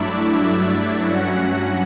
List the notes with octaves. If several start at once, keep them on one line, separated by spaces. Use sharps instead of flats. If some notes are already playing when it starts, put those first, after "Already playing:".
Already playing: G2 F#3 A3 D4 E4 D5 E5
E4 E5
G2 F#3 C#4 F#4 F#5